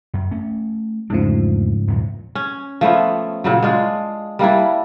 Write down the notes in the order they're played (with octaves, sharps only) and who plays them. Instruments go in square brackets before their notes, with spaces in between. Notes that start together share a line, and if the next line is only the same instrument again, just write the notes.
[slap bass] F#2
A3 C#4
[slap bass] E2 A3 D4 [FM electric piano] G#2 C#3 F3
[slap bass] E2 A#2 F#3
[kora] C#4
F3 A3 B3 C#4
A#2 C#3 F#3
G#3 D4 F4
G3 A#3 D4 E4